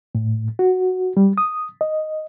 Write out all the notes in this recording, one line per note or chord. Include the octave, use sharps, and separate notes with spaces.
A2
F#4
G3
D#6
D#5